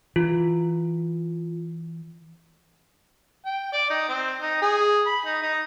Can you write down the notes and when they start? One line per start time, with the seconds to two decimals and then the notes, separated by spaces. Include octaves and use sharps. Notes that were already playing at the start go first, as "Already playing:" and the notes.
0.16 E3 F4
3.45 G5
3.73 D5
3.90 D#4
4.09 C4
4.41 D#4
4.62 G#4
5.06 B5
5.26 D#4
5.42 D#4